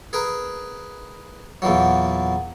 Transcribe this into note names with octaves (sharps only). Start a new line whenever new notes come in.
G#4 A#4 B4
E2 A#2 E3 F#3